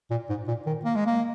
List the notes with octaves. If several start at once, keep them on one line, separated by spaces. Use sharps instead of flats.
A#2
G#2
A#2
D#3
A#3
G#3
A#3